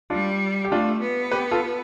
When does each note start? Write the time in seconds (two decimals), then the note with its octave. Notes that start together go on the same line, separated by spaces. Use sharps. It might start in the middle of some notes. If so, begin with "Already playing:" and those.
0.10 G3 D4 F4
0.64 G4
0.71 A3 D4 F4
1.01 B3
1.32 G4 B4
1.51 F4 A4